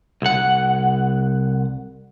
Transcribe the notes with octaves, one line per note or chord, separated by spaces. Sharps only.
C2 F#5